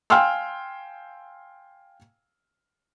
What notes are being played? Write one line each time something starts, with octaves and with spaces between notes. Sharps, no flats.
F5 G5 G#5 C6 E6 F6